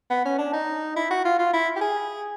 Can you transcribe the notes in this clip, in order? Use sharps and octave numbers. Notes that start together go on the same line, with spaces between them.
B3
C#4
D4
D#4
E4
F#4
F4
F4
E4
G4
G#4